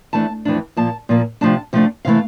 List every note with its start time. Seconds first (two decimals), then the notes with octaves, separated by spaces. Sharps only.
0.13 F2 E3 A3 D4 A5
0.45 F2 E3 A3 D4
0.77 A#2 F3 A#3 A5
1.09 A#2 F3 A#3
1.41 C3 F3 A3 D4 A5
1.73 C3 F3 A3 D4
2.05 C3 E3 A3 F5